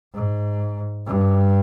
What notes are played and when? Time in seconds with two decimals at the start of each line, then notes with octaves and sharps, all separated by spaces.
0.14 G#2
1.07 G2